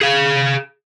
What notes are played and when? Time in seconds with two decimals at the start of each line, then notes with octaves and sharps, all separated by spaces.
0.01 G#4 F5